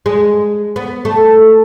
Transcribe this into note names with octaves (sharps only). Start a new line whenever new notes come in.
G#3
B3
A3